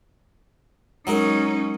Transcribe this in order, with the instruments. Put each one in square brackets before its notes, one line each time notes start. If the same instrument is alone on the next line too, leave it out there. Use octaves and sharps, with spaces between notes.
[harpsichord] F#3 G#3 A#4 [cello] C#4 D#4